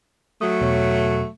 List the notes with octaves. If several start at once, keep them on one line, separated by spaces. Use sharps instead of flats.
F#3 A3 D#6
E2 B2 C#5